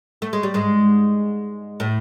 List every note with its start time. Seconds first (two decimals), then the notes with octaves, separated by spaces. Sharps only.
0.22 A3
0.33 G#3
0.43 G3
0.54 G#2 G#3
1.80 A2 A3